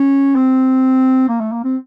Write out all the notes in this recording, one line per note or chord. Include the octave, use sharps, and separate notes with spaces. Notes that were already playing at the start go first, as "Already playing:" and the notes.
Already playing: C#4
C4
A#3
A3
A#3
C4